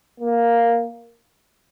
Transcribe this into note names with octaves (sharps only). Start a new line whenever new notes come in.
A#3